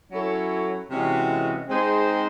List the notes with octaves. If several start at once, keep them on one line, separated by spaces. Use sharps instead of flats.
F#3 C#4 E4 A4 C#5
C3 E3 G#3 C#4 F#4
G#3 C4 D#4 G#4 C5